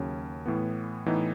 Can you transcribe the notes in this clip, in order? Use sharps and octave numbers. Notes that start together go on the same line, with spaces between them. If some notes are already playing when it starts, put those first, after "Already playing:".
Already playing: D#2 C#3 F#3 C#4
A2 E3 B3
A2 E3 B3 D#4